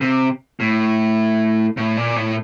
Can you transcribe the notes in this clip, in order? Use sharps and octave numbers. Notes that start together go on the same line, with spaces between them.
C3
A2
A2
A#2
A2